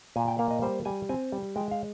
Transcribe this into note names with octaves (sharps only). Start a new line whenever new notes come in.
A#2 G#5
G5
A#3 F5
D#5
G3 C5
G3 G#5
C4 G#5
G3
G#3 G5
F5